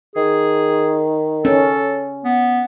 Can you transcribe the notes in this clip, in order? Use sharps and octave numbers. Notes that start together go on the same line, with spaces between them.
D#3 G#4
C#4 A4
B3